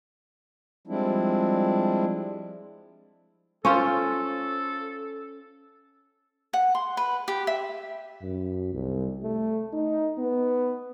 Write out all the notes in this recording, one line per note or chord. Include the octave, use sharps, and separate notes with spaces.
F3 G3 G#3 C4 D4 E4
C#4 F4 A4 C5
F#5
C6
B4
G4
E5
F#2
C2
A3
D#4
B3